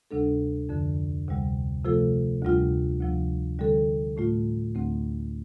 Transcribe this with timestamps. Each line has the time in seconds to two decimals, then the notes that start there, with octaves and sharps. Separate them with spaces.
0.11 D2 C3 G3 D4 A4
0.69 F2 D3 F3
1.28 D2 C3 G3
1.85 C3 F3 A3 F4 A4
2.43 D2 C3 G3 F4
3.01 D2 C3 F3
3.59 D3 G3 C4 A4
4.17 A2 A3 F4
4.75 D2 D3 A3 C4